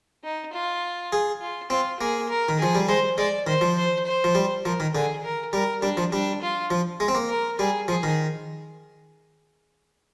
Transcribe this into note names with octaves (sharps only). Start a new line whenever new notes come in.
D#4
F4
G#4
F4
C4 F4
A#3 G#4
A#4
D#3
F3 G#4
G3
G#3 C5
G#3 D5
D#3 C5
F3
C5
C5
F3
G3
F3 A#4
D#3
D3 G#4
A#4
G3 A#4
G3 D4
F3
G3 D4
F4
F3
G#3
C4
A#3
A#4
G3 G#4
F3 G#4
D#3